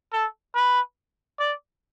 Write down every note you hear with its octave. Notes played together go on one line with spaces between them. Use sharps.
A4
B4
D5